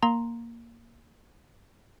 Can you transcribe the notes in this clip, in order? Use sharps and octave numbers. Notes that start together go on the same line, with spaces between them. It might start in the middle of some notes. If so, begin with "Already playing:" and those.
A#3 A#5 C6